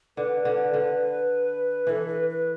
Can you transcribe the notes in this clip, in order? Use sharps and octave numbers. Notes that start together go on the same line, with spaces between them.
D3 B4
D3
D3
E3 A4 B4
B4
B4